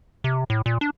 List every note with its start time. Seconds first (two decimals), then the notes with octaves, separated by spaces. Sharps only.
0.24 C3
0.50 A2
0.66 A#2
0.81 D4